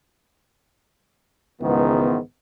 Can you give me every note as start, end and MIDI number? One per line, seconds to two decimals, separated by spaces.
1.61 2.17 37
1.61 2.17 44
1.61 2.17 51
1.61 2.17 52
1.61 2.17 59